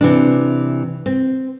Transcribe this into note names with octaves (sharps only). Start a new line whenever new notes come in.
C3 E3 D4
C4